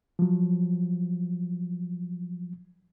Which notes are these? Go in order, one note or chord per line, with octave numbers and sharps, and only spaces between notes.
F3 F#3